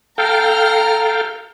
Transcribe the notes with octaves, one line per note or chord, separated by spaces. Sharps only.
A4 F5 G5 A#5 F6